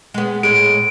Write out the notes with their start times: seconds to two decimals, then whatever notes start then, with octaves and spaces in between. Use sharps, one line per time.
0.14 G#3 B3
0.43 A2 G#3 D7